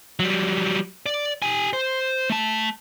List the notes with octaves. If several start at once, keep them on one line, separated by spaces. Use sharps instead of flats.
F#3 G3
D5
G4 G#5
C5
A3 A5